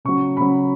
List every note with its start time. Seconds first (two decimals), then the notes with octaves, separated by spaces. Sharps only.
0.05 C#3 F#3 C#6
0.37 C#3 F#3 B5